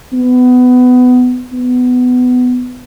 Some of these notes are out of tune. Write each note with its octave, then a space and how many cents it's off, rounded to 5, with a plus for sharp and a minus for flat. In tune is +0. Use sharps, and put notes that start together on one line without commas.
B3 +20
B3 +15